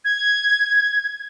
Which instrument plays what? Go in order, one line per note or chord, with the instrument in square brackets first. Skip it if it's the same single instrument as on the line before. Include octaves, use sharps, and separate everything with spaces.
[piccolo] G#6